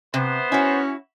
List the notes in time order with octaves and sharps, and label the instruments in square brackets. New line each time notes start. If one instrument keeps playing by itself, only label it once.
[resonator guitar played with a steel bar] C3 [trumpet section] B3 C5
[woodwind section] C#4 [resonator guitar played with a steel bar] E4 F#4